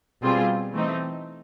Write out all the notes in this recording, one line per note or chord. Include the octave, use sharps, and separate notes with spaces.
B2 G3 C4 F4 G#4
E3 A3 C4 D#4